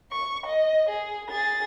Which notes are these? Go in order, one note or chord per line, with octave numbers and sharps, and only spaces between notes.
C#6
D#5
G#4
G#4 A6